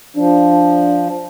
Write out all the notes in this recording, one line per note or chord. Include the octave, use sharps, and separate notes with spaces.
F3 D4